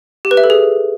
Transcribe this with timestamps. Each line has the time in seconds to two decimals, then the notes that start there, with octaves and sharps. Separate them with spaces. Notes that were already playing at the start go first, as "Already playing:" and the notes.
0.25 G4
0.31 B4
0.37 E5
0.44 A4
0.50 G#4